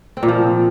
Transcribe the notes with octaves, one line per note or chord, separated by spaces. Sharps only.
C4
A#2
F3